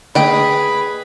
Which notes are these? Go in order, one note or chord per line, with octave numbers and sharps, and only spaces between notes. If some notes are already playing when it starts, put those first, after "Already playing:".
D3 A3 A#3 G#4 B4 D#5 G5 B5